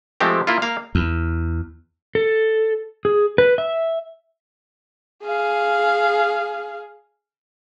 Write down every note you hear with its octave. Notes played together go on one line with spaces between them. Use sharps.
F3 G#3 A3 C4 G4
A#3 E4 F4
A#3 F5
E2
A4
G#4
B4
E5
G#4 F5